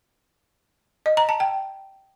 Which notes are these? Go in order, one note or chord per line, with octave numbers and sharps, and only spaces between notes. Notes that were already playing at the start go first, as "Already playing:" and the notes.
D#5
A#5
A5
G5